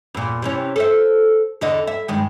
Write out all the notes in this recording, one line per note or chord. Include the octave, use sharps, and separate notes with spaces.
E2 A#2
C3 E3 C#4
A4 C5 E5
E2 D3 D#5
E5
G2 D#3 G#3